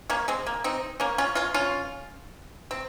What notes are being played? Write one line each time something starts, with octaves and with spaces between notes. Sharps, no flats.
A#3 C#4
G#3 C4
A#3
C4 D#4
A#3 C#4
C#4 F4
C#4 F4
C#4 F4
C4